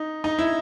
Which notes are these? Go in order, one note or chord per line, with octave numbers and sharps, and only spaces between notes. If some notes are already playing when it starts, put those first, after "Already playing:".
Already playing: D#4
D#4
E4